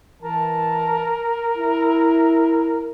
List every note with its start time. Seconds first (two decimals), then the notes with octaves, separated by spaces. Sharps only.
0.22 E3 A#4 A5
1.57 E4